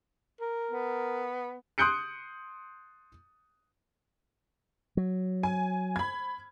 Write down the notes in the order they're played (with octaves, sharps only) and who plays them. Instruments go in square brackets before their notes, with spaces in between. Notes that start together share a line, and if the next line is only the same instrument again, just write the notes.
[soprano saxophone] A#4
[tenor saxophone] B3
[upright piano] C6 D#6 F#6 G6 C#7 D7
[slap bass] F#3
[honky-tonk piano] G#5
B5 G#6